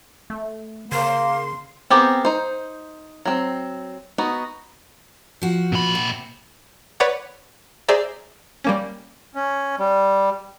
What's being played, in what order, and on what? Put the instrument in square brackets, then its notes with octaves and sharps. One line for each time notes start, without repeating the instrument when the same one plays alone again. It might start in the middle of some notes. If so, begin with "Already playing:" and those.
[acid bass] A3
[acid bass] C#3 [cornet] A#3 [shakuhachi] C6
[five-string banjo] B3 C4 G4 G#4 A#4
D#4 C5
F#3 C4
B3 D#4 F#4
[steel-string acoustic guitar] F3 F#4
[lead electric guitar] A#2 B5
[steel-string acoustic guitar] C3
[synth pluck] B4 C#5 D5 F#5
G#4 C5 D5 E5 A#5
G3 A#3 C#4
[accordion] C#4
G3